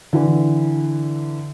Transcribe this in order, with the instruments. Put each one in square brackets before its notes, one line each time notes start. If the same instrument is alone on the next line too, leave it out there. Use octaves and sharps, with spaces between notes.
[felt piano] D3 E3